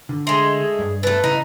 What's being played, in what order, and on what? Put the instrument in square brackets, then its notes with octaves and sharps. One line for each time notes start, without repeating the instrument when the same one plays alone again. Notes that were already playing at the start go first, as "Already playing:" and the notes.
[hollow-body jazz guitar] D3
[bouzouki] G#3 A3 [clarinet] C6
[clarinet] G#4
[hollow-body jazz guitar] G2
[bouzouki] A3 A4 [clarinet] B4
[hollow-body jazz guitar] C#3 E3 [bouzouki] D#4